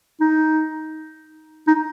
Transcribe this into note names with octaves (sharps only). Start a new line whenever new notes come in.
D#4
D#4